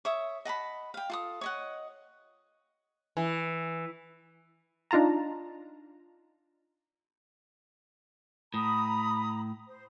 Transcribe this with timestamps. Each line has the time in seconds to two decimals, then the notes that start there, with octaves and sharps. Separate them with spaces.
0.05 C#5 E5 D#6
0.45 D#5 F#5 A5 B5
0.94 F5 G5
1.10 F4 A4 D#6
1.41 C#5 D#5 F#5
3.17 E3
4.91 D4 D#4 F4 A5 A#5
8.54 A2 A#5 B5 D#6
9.68 C5